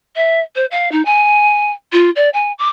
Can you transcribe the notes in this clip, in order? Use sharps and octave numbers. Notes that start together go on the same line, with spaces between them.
E5
C5
F5
D#4
G#5
F4
D5
G#5
D6